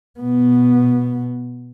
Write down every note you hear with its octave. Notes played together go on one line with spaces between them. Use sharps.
B2 B3